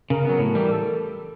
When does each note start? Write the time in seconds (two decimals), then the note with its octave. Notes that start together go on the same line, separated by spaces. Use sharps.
0.10 C#3 A#4
0.25 F#3 B3
0.40 A2
0.55 E3 G3
0.70 A4